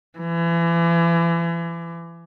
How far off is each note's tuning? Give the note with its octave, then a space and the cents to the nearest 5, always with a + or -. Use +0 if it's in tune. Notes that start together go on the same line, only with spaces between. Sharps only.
E3 +35